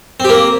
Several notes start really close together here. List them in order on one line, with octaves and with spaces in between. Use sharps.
C4 G4 A#3